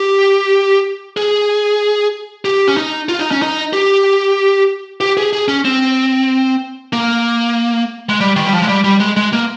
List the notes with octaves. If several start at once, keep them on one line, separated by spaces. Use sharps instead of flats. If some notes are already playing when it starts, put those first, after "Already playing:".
Already playing: G4
G#4
G4
C#4
D#4
F4
D#4
C#4
D#4
G4
G4
G#4
G#4
C#4
C4
A#3
G#3
G3
D#3
G3
F3
G#3
G3
G3
G#3
G#3
A#3